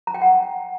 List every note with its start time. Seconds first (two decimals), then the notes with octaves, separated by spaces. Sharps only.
0.07 A#5
0.14 G5
0.22 F#5